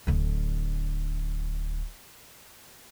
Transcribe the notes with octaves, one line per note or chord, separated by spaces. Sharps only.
D1 D3